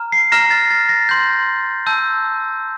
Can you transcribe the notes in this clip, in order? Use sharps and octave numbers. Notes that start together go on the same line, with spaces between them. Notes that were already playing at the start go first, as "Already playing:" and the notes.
Already playing: A#5 F6
C7
A#5 F6 A#6
A6
A6
A#6
C6 G6
A5 E6 G6